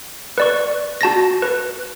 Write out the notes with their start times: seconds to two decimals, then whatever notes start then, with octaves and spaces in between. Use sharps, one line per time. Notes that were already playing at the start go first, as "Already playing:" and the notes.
0.38 B4 D5 C#6
1.01 F#4 A5 A6 A#6
1.42 B4